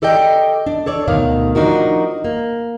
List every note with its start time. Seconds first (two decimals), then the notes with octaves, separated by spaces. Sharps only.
0.02 G4 A4 D5 D#5 G5
0.67 D4
0.86 A4 C#5 D5
1.08 D2 B2 D#3 F5
1.55 F3 D4 D#4 F#4 A#4
2.25 A#3